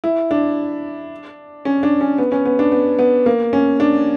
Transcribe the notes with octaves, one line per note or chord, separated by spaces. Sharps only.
E4
D4
C#4
D4
C#4
B3
C#4
B3
D4
B3
B3
A#3
C#4
D4